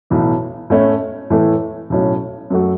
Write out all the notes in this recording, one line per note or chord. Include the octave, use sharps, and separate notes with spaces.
B1 A2 E3 B3
A2 A3 C#4 E4
A2 E3 A3
B1 A2 F#3 C#4
F#2 F#3 A3 F#4